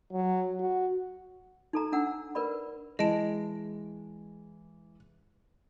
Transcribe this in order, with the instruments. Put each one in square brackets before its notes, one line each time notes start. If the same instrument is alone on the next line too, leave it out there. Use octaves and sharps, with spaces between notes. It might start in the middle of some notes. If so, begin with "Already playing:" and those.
[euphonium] F#3
F#4
[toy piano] D#4 A4 A#5
D4 F#5 E6
A#4 B4 D5 B5
[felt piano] E3 [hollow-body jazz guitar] G#3 [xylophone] D#5 A5 D7